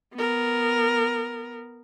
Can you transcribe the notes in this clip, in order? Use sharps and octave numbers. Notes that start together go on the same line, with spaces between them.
B3 A#4